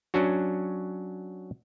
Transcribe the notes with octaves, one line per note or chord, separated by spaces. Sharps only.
F#3 C#4 D4 F#4